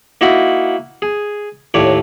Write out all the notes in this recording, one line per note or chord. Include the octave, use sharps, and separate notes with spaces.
A#3 D#4 E4 F#4 F#5
G#4
D#2 A2 C#5 D5